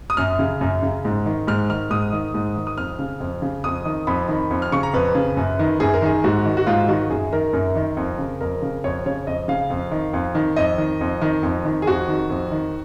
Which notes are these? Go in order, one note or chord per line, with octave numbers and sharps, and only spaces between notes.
D#6
F#2 F6
C#3
F#2
C#3
G#2
D#3
G#2 F6
D#3 F6
G#2 D#6
D#3
G#2
D#3
D#6
F2 F6
C#3
F2
C#3
F2 D#6
D#3
F2 B5
D#3
F2
F6
C#3 C#6
A#5
F2 B4
C#3
F#2
D#3
F#2 G#4
A#4
D#3 G#4
G#2 F#4
D#3
F#4
G#2 F4
D#3 F#4
F#2 G#4
D#3 A#4
F#2 A#4
D#3
F2
C#3
F2 A#4
C#3
F2 C#5
C#3 C#5
F2 D#5
C#3 F5
F2
D#3
F2
D#3
F2 D#5
D#3
F2
D#3
F2
D#3
G#4
F2 F#4
D#3
F2
D#3